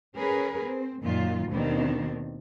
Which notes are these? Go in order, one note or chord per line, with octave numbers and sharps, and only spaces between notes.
C#4 G#4 A#4 B4
C4
F#2 A#2 D#3 F#3 F4
D#2 B2 D#3 A#3 C4 D4